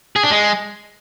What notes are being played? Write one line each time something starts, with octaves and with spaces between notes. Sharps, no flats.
G#4
D4
G#3